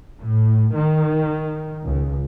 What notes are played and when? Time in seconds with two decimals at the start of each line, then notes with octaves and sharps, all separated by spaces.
0.21 A2
0.76 D#3
1.85 C#2